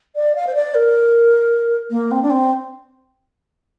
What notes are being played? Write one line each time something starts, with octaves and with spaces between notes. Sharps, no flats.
D5
F5
C5
D5
A#4
A#3
C4
D4
C4